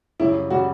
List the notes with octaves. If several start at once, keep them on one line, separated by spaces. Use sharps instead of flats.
F#2 C#3 G3 E4
C#3 G3 F#4